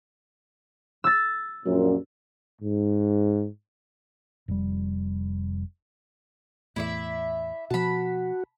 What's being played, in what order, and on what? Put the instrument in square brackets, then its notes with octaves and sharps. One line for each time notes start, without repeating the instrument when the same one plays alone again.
[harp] E6 A6
[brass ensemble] A#1 F#2 A#2
[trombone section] G#2
[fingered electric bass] F1 G3
[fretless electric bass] E2 A2 [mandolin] E4 D5 E5
[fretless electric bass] B2 F3 [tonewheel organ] F#4 [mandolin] A5 B5